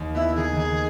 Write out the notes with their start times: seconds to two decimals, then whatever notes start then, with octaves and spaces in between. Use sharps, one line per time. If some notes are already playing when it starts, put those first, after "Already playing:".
Already playing: D#2
0.15 B3 E4
0.36 D#3 G#4
0.56 D#3